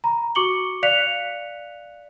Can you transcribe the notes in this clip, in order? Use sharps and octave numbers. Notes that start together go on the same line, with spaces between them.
A#5 B5
F#4 C#6 D6 C#7 F#7 G7
D5 F5 F#6 B6 C#7 F7